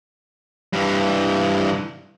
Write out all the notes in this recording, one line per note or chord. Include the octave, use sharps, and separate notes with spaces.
G2 E3